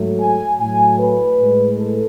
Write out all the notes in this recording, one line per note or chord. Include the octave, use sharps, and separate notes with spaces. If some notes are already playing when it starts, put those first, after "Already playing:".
Already playing: G#2 F#3 A3
G#5
A2 F#3 A3 G#5
B4
A2 G#3
A4